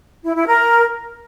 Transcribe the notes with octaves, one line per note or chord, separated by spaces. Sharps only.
E4
E4
A#4